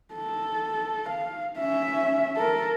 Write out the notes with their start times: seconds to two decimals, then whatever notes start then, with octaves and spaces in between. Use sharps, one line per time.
0.14 A4
1.09 F5
1.59 C#4 E5
2.37 A4 A#4